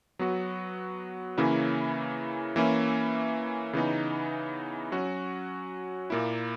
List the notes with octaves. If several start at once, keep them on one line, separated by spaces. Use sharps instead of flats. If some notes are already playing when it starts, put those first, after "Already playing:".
F#3 B3 F#4
C#3 E3 A#3 C#4 E4
E3 A#3 C#4 E4
C#3 E3 B3 D#4
F#3 C#4 F#4
A#2 A#3 E4